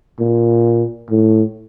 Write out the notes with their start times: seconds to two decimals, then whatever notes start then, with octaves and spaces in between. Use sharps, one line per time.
0.20 A#2
1.10 A2